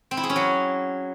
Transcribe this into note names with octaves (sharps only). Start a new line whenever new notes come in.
C4
E4
G#4
C#4
F#3